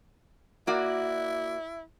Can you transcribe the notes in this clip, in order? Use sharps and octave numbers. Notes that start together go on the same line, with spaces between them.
A#3 E4 F#4 D5